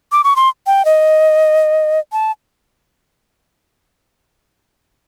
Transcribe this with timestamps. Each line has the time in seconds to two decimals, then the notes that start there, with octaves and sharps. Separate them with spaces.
0.12 D6
0.24 C#6
0.36 C6
0.67 G5
0.85 D#5
2.12 A5